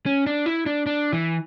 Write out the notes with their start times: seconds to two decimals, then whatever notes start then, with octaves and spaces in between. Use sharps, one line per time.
0.06 C#4
0.26 D4
0.46 E4
0.66 D4
0.86 D4
1.13 E3